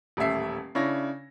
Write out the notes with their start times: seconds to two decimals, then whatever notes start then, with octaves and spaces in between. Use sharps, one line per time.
0.17 D#1 A1 A3 E5 C7
0.75 C#3 D4 E4 C#5 C#6 A#6